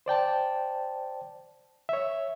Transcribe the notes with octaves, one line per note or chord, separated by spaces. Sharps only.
C5 D5 G5 A5
C#5 E5